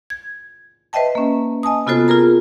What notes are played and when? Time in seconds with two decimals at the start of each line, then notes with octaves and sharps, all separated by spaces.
0.10 G#6
0.93 B4 C5 D#5 E5 G5 A5
1.15 A#3 C#4
1.63 D#5 G#5 A5 D#6
1.87 C3 B3 F4 F#4 A4 C5
2.08 F4 G#4 A#4 A#5